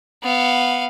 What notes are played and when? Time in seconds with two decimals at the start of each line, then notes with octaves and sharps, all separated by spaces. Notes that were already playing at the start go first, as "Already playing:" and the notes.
0.23 B3 F5